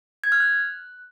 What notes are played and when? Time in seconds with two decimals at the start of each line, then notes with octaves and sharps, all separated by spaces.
0.24 G#6
0.32 F6
0.40 F#6